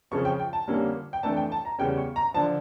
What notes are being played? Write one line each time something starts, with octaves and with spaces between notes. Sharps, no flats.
F2 C#3 F3 C#4 C#6
G5
G5
A5
F2 D3 G3 A#3 C#4
G5
F2 E3 A3 D4 A5
G5
A5
A#5
E2 C#3 G3 C#4 G5
C#6
A#5
D3 F3 A5